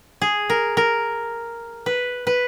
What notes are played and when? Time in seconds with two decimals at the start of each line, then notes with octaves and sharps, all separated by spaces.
0.22 G#4
0.50 A#4
0.77 A#4
1.86 B4
2.27 B4